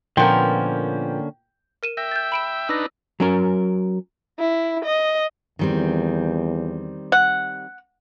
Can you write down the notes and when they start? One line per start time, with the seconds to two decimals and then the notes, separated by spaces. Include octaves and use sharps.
0.17 A#2 D3 F3 A#3 B3 C#4 A#4 G5
1.83 A#4 D#7 E7
1.97 E5 G5 A#6
2.11 G6 A6
2.32 B5 D7 E7
2.69 D4 D#4 B4 E6 A#6
3.20 F#3 C#4 A#4
4.39 E4
4.85 D#5
5.59 E2 D#3 G3 C4
7.12 F#5